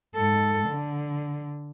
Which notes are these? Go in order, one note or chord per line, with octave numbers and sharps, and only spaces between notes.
G#2 A4
D3